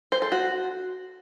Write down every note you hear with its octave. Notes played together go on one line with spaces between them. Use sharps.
C5
A4
F#4